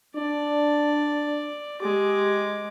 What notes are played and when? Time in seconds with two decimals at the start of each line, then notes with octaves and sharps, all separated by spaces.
0.16 D4 D5
1.82 G#3 G4 D6